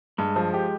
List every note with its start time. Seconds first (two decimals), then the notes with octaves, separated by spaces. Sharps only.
0.18 G2 G#3
0.36 F3
0.54 G4